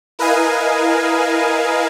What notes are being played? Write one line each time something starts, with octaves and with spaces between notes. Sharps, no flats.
E4 A#4 B4 D#5 F5 G#5